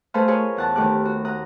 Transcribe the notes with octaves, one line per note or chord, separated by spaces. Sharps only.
A3 G#4 A4 B4 C5 F5
F4 G#4 A#4 B4 C#5 D#5
E2 F#5 A5
D#2 D#3 A3 G4 D6 F#6
F#4
F#5 A#5 D#6